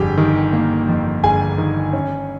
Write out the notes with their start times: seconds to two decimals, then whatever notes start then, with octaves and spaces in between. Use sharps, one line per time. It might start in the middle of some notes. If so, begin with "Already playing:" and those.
Already playing: G1 F2 G4 G#4
0.17 D#3
0.53 A#3
0.88 F2
1.23 G1 G#4 G#5
1.58 D#3
1.93 C#4